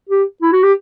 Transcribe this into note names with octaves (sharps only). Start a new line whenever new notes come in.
G4
E4
F#4
G4